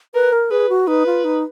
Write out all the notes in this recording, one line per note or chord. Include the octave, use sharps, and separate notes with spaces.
A#4 B4
A#4
G#4 B4
F#4
D#4 B4
F4
D#4